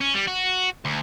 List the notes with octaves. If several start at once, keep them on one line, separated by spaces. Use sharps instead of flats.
C#4
G3
F#4
D2